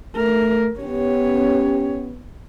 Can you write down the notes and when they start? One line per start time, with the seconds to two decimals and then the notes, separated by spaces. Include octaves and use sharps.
0.16 A3 A#4
0.80 B3 C#4 G4 C#5